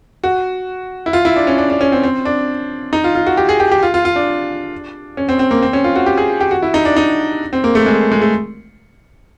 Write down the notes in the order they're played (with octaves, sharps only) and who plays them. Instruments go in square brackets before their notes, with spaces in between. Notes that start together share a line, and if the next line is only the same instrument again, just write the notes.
[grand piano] F#4
E4
F4
E4
D4
C#4
D4
D4
C#4
C4
C4
D4
D#4
F4
F4
F#4
G4
G#4
G4
G4
F4
F4
F4
D4
C#4
C4
C4
A#3
C4
C#4
F4
F#4
G4
G#4
G4
F#4
E4
D#4
D4
D#4
C4
A#3
A3
G#3
G#3
A3